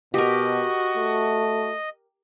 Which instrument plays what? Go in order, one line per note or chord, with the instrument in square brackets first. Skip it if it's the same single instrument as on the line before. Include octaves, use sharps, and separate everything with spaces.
[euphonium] B2 [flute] F#4 [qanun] G4 A#4 [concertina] D#5
[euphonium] A3